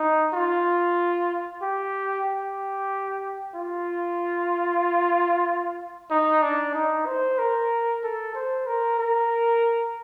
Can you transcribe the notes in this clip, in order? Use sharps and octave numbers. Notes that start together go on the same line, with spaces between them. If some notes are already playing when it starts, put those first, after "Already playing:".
Already playing: D#4
F4
G4
G4
F4
D#4
D4
D#4
C5
A#4
A4
C5
A#4
A#4